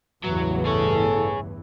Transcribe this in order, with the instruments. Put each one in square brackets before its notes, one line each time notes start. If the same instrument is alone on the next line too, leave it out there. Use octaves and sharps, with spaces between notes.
[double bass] A1 C#3 [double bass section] E2 G2 E3 [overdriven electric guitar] F#3
[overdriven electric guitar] G#4 C#5 [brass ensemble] A4